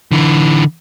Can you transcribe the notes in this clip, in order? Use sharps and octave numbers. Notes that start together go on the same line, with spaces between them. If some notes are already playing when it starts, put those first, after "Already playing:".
D3 E3